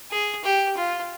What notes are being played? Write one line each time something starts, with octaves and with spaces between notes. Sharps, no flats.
G#4
G4
F4